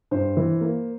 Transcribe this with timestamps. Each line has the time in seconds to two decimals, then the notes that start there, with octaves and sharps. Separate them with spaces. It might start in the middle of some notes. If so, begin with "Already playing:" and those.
0.11 G2 C5
0.37 E3
0.61 A#3